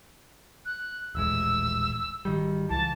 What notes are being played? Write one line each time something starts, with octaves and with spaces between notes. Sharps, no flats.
F#6
D#1 A1 G#3 E6
G#1 D#3 G3
C#2 E3 A5